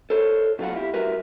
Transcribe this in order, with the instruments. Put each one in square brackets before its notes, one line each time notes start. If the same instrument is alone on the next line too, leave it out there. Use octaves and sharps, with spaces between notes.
[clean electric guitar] A4 C5 C#5
B2 F#3 F4 A#4 F5 F#5
E4 G4
G3 F#4 A#4 B4 E5